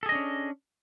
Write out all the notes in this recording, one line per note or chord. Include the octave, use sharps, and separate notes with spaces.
C#4 D4 G#4 A4 D#5